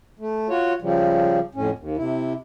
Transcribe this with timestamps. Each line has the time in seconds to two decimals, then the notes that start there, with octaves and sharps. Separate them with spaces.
0.19 A3
0.49 F4 F#4 C#5
0.82 C#3 F3 G3
1.55 F2 A2 C#4
1.79 D#2
1.97 C3 E4